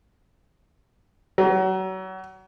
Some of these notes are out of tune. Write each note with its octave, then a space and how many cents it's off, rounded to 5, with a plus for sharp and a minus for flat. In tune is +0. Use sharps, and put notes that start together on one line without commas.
F#3 +30